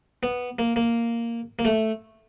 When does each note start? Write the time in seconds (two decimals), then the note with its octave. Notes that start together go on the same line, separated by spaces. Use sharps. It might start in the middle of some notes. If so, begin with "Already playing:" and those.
0.23 B3
0.59 A#3
0.76 A#3
1.59 A#3
1.65 A3